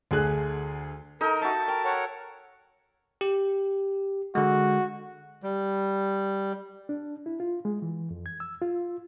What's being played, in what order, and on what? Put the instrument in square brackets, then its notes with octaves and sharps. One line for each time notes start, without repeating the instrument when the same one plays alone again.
[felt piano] D2 D3 G#4 F#6
[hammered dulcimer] D#4 [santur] A4 [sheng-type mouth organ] A#4
[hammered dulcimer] F#4 E5 [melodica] A5
[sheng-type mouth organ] A#4 [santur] G5
[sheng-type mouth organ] A#4 C#5 F#5
[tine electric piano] G4
[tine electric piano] D3 G#3 [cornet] F#4
[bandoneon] G3
[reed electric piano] D4
E4
F4
G#3
E3
F2
G#6
E6
F4